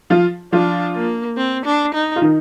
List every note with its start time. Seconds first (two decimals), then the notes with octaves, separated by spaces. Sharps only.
0.10 F3 F4
0.52 F3 D4 F4
0.95 A#3
1.37 C4
1.65 D4
1.94 D#4
2.16 F4
2.22 D#3 D#4